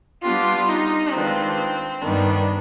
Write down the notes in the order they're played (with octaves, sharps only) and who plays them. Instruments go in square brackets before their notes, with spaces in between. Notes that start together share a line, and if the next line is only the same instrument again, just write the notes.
[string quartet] G3 B3 D4 G4 [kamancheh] F4
[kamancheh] D#4
[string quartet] D#3 G#3 D4 F4 B4 [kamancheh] C4
[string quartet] G2 D#3 G3 B3 [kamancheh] D4